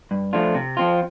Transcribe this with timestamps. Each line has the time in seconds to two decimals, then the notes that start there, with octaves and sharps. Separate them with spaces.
0.11 G2
0.33 F3 A3 D4 F4
0.55 C3
0.77 F3 C4 F4